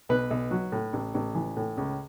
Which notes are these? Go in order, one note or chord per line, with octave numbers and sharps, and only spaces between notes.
B1 B4
B1
F#3
A2
A1
A1
E3
A2
C#2